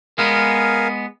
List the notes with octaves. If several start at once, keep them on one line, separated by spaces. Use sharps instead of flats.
G#3 B3 A#4 F5 G#5